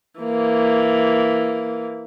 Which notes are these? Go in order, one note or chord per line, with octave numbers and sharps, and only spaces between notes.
E3 A#3